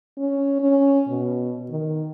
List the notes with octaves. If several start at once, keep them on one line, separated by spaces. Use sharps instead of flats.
C#4
C#4
B2
D#3